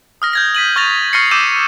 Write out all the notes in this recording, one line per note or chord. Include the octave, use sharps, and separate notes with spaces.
D#6 F6 A#6
G6 G#6 A#6
B6 D#7 F#7
C#6 F6 G6 A6 A#6 F7
C#6 F6 A6 A#6 C7 C#7
D6 E6 G6 D#7 E7